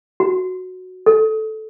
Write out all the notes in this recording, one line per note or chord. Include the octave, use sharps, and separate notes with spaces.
F#4
A4